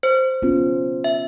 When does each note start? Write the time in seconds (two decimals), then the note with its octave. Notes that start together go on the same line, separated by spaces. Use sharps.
0.03 C5
0.42 B3 C#4 F4
1.04 E5